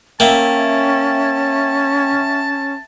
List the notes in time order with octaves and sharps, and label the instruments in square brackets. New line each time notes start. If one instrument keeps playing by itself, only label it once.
[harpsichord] A#3 [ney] C#4 [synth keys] E5 G5 [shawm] A5